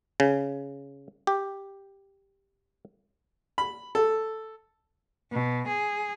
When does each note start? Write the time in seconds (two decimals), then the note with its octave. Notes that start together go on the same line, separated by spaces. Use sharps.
0.20 C#3
1.27 G4
3.58 B5
3.95 A4
5.32 B2
5.67 G#4